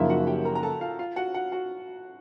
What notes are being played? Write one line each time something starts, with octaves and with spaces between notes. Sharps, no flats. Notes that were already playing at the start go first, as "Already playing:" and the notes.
Already playing: F#2 C#3 F3 A#3 D#4 E4 E5
F#4 F#5
G4 G5
A#4 A#5
A#5
A4 A5
F4 F5
F4 F5
F#4 F#5
F#4 F#5
F#4 F#5